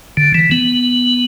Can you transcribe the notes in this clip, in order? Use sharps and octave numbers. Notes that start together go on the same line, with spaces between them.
D3
E3
B3